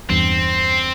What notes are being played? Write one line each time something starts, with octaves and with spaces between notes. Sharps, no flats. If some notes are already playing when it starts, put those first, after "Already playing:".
E2 G2 C4